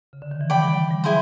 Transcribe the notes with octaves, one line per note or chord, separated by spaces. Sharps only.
C#3
D3
D#3
E3
F3 D5 G5 B5
G3
G3
F#3 E4 G#4 C5